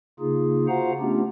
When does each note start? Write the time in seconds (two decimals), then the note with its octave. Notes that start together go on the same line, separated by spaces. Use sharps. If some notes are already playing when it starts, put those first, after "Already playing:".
0.20 C#3 A#3 D#4 F4 G#4
0.68 F4 F#4 C5 F5 F#5 A#5
1.00 A3 B3 C#4 D4 F4 G4